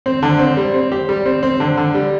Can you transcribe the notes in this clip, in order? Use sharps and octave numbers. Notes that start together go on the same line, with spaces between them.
C4
D3
C4
G3
C4
G4
G3
C4
C4
D3
D3
G3